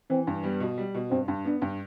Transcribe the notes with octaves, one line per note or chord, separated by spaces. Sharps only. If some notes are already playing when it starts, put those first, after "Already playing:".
E3 C4
G2
G3 B3
B2
G3
B2
G2 C4
G2
B3 D4
G2